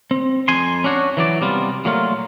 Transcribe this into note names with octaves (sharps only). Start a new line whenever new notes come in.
C4
F2 G#5 C6
C#4 D4 F#4 C#5
E3 F#3 D5
C3 G3 B3 F4
A#2 F#3 A3 A#3 F4